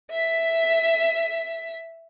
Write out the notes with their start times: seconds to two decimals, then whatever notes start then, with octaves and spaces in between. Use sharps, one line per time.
0.11 E5 B6